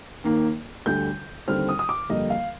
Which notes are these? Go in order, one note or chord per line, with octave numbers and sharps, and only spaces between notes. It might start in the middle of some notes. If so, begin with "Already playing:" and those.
D#2 D#3 A#3
D2 D3 G3 G6
D#2 D3 G3 C4 F6
D#6
D#6
D6
F2 D3 G3 A#3 D#5
F5